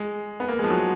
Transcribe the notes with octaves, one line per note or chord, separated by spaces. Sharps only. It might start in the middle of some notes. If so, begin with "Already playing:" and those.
Already playing: G#3
B3
A#3
G#3
F3
F#3